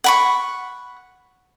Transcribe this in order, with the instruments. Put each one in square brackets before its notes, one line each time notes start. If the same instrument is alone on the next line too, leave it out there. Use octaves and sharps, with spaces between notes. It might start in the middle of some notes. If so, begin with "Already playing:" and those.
[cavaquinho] F#5 B5 C#6